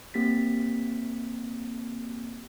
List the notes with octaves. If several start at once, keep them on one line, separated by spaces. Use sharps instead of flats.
A#3 C4 G4 A6 B6